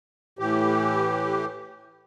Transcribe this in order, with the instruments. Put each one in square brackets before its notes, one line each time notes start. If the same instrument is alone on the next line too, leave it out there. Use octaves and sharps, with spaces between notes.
[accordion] A2 E3 G4